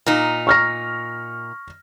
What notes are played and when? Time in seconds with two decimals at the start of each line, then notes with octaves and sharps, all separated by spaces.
0.06 A#2 D#4
0.47 C#6 F6 A#6